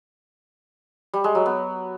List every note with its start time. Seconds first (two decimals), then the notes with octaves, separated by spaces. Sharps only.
1.14 G3
1.24 G#3
1.35 F#3
1.46 B3